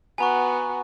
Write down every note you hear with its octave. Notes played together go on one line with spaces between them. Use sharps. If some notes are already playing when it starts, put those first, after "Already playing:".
B3 F#4 G#5 A#5 C#6